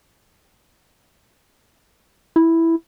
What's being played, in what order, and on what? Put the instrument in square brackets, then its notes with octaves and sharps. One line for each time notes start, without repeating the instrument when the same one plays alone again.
[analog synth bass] E4